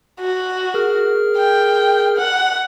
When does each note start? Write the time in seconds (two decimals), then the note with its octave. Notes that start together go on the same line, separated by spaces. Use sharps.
0.20 F#4
0.74 G#4 A#4 F6
1.37 G5
2.18 F#5